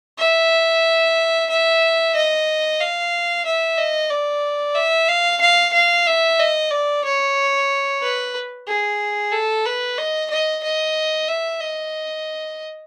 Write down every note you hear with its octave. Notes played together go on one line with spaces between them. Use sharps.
E5
E5
D#5
F5
E5
D#5
D5
E5
F5
F5
F5
E5
D#5
D5
C#5
B4
G#4
A4
B4
D#5
D#5
D#5
E5
D#5